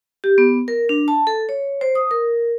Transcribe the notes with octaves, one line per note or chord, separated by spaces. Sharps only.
G4
B3
A#4
D4
A5
A4
C#5
C5
D#6
A#4